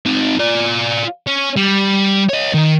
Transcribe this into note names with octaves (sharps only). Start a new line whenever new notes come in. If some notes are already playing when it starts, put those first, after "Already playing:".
C4 D#4
F4 D5
C#4
G3
C#5 D#5
D#3